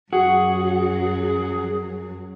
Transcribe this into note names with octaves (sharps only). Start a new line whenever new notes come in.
F#2 F#3 F#4 G#4